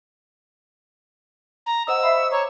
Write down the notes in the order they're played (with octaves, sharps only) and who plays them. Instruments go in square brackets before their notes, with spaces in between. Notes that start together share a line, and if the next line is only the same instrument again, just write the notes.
[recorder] A#5
[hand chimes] C5 D#5 D#6 [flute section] F#5 [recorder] E6
[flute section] E5 F5 B5
C#6
[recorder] C#5 [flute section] A#5 D6